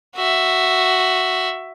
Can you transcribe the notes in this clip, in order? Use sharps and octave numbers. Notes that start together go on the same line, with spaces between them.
F#4 E5